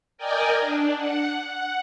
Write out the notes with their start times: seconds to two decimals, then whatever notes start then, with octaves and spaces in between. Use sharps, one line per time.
0.18 A#4 D5 D#5 G5 G#5
0.59 D4
0.97 F#5
1.48 F#5